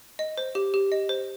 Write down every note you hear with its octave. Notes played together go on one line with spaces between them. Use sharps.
D#5
C5
G4
G4
D#5
C5